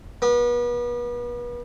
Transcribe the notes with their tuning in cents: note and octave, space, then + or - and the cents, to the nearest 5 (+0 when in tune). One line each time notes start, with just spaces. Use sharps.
B3 -35